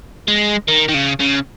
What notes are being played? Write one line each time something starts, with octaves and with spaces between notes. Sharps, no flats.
G#3
D#3
D#3
C#3
C#3